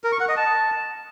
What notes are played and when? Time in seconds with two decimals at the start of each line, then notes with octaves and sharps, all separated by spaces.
0.04 A#4
0.12 C#6
0.20 F#5
0.29 D#5
0.37 A5